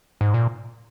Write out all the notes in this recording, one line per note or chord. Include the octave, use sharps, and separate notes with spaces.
G#2
A#2